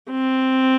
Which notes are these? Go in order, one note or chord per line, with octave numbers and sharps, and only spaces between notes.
C4